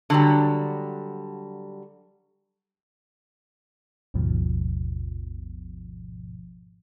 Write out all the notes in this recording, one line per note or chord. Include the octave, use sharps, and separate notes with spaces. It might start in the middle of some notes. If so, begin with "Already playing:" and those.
D3 F#3 G3
G#1 D#2 G#2 B2 F3